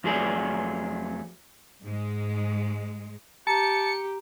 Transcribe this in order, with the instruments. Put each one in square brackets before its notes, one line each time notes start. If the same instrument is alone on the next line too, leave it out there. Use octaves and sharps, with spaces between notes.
[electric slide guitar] F2 F#3 A3 G#4 D5
[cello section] G#2 G#3
[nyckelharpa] G4 [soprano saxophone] A5 [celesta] A#5 [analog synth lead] C#7